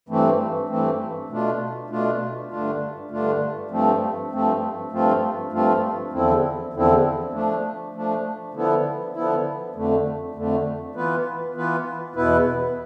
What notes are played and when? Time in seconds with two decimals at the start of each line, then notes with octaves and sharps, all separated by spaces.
0.09 G2 E3 A3 C4
0.69 G2 E3 A3 C4
1.29 B2 A3 D4 F4
1.90 B2 A3 D4 F4
2.50 G2 D3 A3 D4 F4
3.11 G2 D3 A3 D4 F4
3.71 G2 F3 A3 C4
4.32 G2 F3 A3 C4
4.91 G2 F3 A3 C4 F4
5.52 G2 F3 A3 C4 F4
6.12 E2 D3 F3 C4 E4
6.73 E2 D3 F3 C4 E4
7.33 F3 A3 D4
7.94 F3 A3 D4
8.54 D3 F3 B3 E4
9.14 D3 F3 B3 E4
9.75 F2 D3 A3
10.35 F2 D3 A3
10.95 E3 B3 F4 B4
11.55 E3 B3 F4 B4
12.15 E2 B2 B3 E4 B4